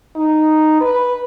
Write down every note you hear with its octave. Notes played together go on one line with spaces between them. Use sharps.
D#4
B4